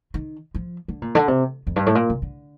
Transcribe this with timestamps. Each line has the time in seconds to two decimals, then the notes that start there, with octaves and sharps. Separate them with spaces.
0.14 D#3
0.55 F3
0.88 D3
1.02 A#2
1.15 D3
1.28 C3
1.67 F2
1.76 G2
1.86 A2
1.95 A#2
2.10 C3
2.22 D3